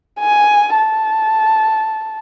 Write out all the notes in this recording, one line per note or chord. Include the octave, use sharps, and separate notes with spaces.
G#5
A5